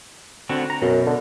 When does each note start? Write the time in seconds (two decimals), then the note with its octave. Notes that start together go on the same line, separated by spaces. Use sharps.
0.49 D3 C4 F#4
0.70 A#5
0.82 F#2 B2
1.07 D3